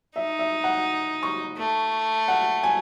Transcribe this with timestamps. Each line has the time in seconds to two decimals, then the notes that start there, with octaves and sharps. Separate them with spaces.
0.16 D#4 E5
0.39 E5
0.64 F#5
1.23 C#6
1.58 A3
2.28 F#5
2.63 G#5